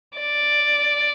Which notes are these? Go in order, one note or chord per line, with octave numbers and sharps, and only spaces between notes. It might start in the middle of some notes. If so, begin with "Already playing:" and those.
D5